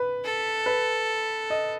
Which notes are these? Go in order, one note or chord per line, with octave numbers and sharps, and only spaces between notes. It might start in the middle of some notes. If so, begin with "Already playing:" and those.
Already playing: B4
A4
B4
D#5